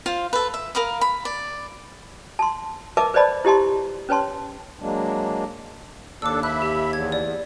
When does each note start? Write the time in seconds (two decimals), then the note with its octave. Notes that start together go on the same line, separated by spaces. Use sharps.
0.06 F4 C5 F5
0.33 A4 B4
0.54 E5
0.75 A#4 F5 B5 D#6
1.01 B5
1.25 D5
2.39 A5 C6
2.97 A#4 B4 D#5 E5 A5 D6
3.14 B4 C5 D5 D#5 A5 B5
3.45 E4 G4 D#5 A5 C6
4.09 C#4 B4 C#5 A5 C6
4.80 F#3 G#3 A#3 D4
6.22 D#2 D4 A4 D6 E6
6.43 E5 B5 F#6
6.62 G4
6.93 E2 G#6
7.12 D5